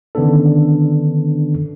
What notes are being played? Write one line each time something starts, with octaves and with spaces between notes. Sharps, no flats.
D3 D#3 B3 C#4 D4 A4